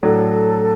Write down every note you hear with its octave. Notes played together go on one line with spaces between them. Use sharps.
A2 F#3 D4 A4